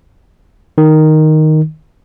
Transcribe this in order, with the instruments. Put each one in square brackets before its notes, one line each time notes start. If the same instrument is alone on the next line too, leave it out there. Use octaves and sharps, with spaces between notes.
[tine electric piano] D#3